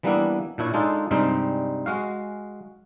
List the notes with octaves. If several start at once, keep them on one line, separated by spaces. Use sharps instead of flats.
E3 G3 A#3 B3 D4 E4
A#2 D4 E4 C#5
G#3 D4 D#4 F4 A4
G2 C3 G3 G#3 C4 D#4
G#3 F#4 F5